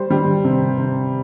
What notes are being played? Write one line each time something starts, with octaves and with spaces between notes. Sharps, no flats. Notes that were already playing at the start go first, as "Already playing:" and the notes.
Already playing: G3 C5
G3
C3
C3